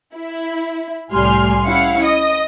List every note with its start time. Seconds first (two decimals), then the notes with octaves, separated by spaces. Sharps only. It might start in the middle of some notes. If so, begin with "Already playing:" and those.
0.14 E4
1.12 C2 A2 G3 G#5 C6 F6
1.66 C#4 E4 F5 F#5 C#7
2.04 D#5 D#6